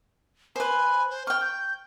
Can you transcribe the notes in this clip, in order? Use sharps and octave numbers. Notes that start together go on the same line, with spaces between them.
B4 C5 G#5
C5
G5 C#6 F6
G6